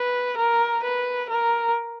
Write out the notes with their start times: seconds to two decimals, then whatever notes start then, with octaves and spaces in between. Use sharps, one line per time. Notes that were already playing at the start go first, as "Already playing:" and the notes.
Already playing: B4
0.38 A#4
0.83 B4
1.29 A#4